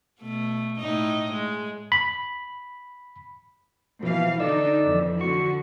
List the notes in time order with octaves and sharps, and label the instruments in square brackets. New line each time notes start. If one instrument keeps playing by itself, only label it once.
[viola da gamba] B2 A3
A2 D#4 D#5
G#3
[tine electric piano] B5
[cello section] B2 E3 F5 [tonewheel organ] F3
[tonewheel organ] D3 D5 E6 [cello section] D4 D#4
[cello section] F2 E3
[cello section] D3 F#4 [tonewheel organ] C#6